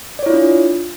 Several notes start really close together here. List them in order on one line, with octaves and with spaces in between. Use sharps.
D5 C#5 E4 F4 D4